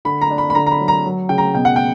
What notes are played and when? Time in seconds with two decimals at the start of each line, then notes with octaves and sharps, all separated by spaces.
0.05 D3 B5
0.21 A#5
0.30 D4
0.38 B5
0.50 B5
0.55 D3 A#5
0.66 A#5
0.71 B5
0.80 F#3
0.88 A#5
1.05 F#3
1.29 C#3 G5
1.38 A#5
1.55 B2 G5
1.65 F#5
1.76 G5